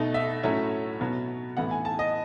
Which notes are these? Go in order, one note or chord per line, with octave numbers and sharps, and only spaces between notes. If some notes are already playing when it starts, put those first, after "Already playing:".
Already playing: B2 A3 D#4
E5
A2 F#3 A3 C#4 E4
B2 F#3 B3
A2 E3 B3 E4 F#5
G#5
A5
D#5